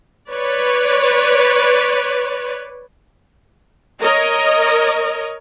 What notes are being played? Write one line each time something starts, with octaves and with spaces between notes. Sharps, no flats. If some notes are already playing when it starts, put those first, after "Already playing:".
B4 C#5 D5
A#4 C#5 D#5